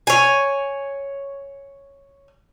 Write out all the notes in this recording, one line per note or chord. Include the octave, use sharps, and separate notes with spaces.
C#5 G#5